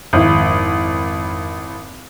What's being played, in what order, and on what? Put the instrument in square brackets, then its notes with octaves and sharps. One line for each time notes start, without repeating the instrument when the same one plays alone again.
[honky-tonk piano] G#1 E4 [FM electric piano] F2